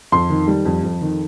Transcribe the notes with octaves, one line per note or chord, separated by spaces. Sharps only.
F2 C6
D#3
G3
F2
F2
D#3